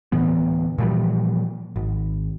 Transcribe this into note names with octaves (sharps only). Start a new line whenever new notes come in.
D2 A2 E3 B3
A#2 E3 F3 G3
G#1